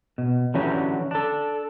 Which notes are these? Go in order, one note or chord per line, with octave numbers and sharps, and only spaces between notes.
B2
D3 E3 F#3 C#4 G4
D4 A4